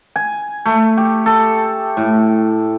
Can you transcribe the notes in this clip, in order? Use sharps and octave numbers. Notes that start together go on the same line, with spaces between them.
G#5
A3
G4
A4
A2